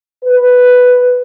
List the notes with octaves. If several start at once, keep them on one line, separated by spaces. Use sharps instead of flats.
B4